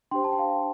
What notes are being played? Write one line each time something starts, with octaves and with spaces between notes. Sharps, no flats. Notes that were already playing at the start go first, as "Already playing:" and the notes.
D4 G4 C5 G5 C6
A5
G5
F5